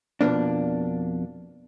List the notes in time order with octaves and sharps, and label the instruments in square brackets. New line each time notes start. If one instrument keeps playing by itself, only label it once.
[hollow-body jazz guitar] F2 B2 A#3 D4